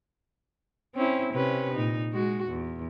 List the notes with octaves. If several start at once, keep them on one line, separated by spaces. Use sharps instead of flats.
C4 C#4 E4
C3 C#4 B4
A#2 D#4
G#3 F#4
E2